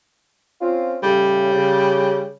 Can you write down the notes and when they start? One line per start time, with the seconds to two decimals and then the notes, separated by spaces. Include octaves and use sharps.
0.61 C4 C#4 F4
1.03 A2 C#3 G3
1.53 C#3